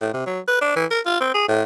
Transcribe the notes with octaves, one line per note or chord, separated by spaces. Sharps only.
A2
C3
F#3
B4
D4
E3
A#4
F4
C4
G#4
A2